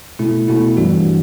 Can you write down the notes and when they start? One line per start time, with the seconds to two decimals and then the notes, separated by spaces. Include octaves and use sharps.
0.19 B2 A3 E4
0.48 B2 A3 E4
0.77 G2 E3 G3 D4 F#4